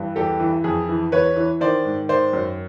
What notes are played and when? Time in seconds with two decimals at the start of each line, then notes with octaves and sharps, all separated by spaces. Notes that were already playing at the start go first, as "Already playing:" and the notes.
Already playing: G2 E3
0.16 E2 G4 A4
0.40 E3
0.64 F2 G#4
0.88 E3
1.12 E2 B4 C#5
1.36 E3
1.61 D#3 C5 D5
1.85 G#2
2.08 D#3 C5 D5
2.33 F#2